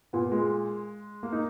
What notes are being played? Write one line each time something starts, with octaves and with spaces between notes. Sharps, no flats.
A#2 B3
G#3
A#3
D#4